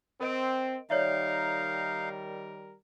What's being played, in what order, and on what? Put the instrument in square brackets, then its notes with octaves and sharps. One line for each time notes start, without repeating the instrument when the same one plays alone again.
[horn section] C4 [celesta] A#4 D#5 D7
[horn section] D#3 G3 A#4 [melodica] D#4 F5 [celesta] C#5 D5 E5